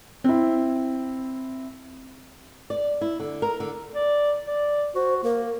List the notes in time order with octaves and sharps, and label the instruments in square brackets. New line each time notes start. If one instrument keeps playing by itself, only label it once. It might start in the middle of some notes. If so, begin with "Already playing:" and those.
[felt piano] C4 E4
[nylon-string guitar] D5
E4
D3
A#4
D3
[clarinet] D5
D5
[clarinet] F#4 [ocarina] C5
[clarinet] A#3 [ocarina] A#4